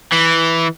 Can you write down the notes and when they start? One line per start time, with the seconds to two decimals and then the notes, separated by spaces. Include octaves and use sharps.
0.12 E3